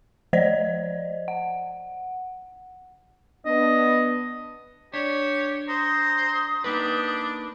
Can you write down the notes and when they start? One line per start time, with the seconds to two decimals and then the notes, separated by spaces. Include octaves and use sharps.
0.33 F3 C5 D5 D#5
1.28 F#5
3.46 B3 D4 D#5
4.94 D4 G4 C#5
5.68 C5 A#5 D#6
6.64 A#3 D4 D#4 G4 B4